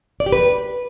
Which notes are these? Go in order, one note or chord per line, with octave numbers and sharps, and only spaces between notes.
D5
G4
B4